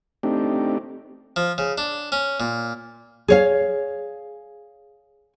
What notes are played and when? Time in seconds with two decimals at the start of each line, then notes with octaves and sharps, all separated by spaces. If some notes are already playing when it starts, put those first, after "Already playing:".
0.23 A3 C4 D4 D#4 G4
1.36 F3
1.58 C#3
1.78 D4
2.12 C#4
2.40 A#2
3.28 G#4 C#5 F5